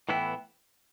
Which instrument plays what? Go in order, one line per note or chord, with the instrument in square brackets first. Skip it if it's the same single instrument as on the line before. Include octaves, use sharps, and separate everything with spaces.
[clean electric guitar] A2 E3 B3 E4 [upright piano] G5